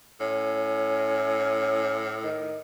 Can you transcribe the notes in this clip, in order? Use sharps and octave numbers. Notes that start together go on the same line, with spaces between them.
A2 C#4
D#3